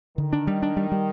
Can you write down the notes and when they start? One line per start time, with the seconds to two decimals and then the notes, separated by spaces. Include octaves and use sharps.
0.18 D3 D#3
0.33 D4
0.47 G3
0.62 D4
0.77 G3
0.92 G3